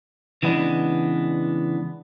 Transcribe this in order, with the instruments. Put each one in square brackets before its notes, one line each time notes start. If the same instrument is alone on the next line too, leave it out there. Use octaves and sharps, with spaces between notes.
[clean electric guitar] C#3 E3 G#3 B3 C#4 D4